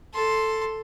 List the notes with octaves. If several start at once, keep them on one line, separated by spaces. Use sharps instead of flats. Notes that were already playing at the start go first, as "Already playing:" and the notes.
A4 C6